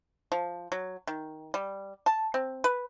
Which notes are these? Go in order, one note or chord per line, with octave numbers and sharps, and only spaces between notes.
F3
F#3
D#3
G3
A5
C4
B4